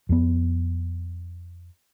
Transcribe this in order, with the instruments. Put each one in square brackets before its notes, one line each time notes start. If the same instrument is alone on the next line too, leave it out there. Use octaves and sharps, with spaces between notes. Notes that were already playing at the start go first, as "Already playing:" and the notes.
[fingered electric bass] F2 B3